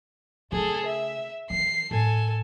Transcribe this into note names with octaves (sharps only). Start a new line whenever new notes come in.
C#3 A3 G#4 A4
E5
E3 C7
A2 A4 G#5